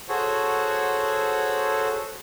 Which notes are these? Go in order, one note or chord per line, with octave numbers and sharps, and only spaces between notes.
F#4 G#4 A4 C5 C#5 F#5